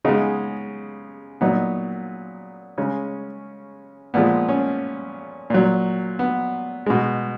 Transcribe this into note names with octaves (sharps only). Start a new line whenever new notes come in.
C#3 G#3 B3 D#4
A#2 F#3 B3 D#4
C#3 G#3 C#4
A#2 F3 G#3 B3
C#4
A#2 F#3
B3
B2 G#3